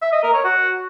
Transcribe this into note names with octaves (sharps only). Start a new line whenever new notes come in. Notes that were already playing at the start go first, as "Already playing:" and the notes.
E5
D#5
A#4
C#5
F#4